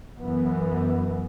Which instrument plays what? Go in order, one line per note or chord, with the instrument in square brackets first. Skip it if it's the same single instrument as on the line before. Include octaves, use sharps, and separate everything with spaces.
[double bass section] F#2 E3 B3